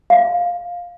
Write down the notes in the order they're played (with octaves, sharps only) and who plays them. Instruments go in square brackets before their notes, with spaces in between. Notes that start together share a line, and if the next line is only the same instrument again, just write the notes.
[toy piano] F5